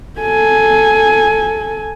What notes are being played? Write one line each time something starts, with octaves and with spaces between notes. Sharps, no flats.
A4 G#5